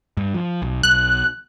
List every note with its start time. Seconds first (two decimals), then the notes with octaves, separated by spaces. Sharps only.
0.17 G2
0.34 F3
0.62 B1
0.83 B1 F#6